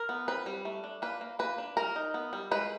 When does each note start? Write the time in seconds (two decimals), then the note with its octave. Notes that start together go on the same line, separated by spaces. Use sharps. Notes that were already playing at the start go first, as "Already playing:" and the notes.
Already playing: A#4
0.09 B3
0.28 C4 B4
0.46 G3
0.65 A3
0.84 D4
1.02 A#3 B4
1.21 A#3
1.39 A#3 B4
1.58 D4
1.77 G3 A#4
1.96 D#4
2.14 B3
2.33 G3
2.51 G#3 B4